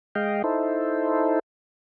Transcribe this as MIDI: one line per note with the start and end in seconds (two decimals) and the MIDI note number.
0.15 0.42 56
0.15 0.42 75
0.15 0.42 77
0.15 0.42 79
0.44 1.39 63
0.44 1.39 64
0.44 1.39 69
0.44 1.39 72